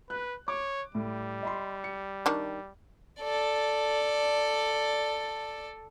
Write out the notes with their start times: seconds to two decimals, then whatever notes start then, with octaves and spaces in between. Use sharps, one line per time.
0.10 B4 F#6
0.48 C#5 D6
0.95 A2 G3
1.43 D#5 B5 C6
1.84 C#7
2.26 D#3 D4
3.20 A4 D5